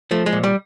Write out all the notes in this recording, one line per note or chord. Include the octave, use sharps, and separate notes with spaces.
F3 A3
G#3
A#2
G3